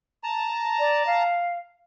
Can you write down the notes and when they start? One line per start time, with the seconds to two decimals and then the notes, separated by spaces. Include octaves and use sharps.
0.24 A5 A#5
0.79 D5
1.06 F5